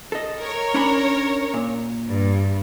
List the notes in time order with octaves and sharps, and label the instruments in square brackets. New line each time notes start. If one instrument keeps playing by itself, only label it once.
[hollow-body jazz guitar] A4 D#5
[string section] A#4 C#5
[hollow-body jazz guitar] C#4 D4 B5
A#2
[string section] G2